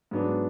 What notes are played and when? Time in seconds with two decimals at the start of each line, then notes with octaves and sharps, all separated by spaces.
0.11 G#2 F#3 B3 D4